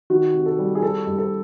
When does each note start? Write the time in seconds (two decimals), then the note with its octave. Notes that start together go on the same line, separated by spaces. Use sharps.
0.10 D#3 F#4
0.34 C3
0.46 A4
0.59 G3
0.75 G#4
0.82 E3 A4
1.07 G2
1.19 A4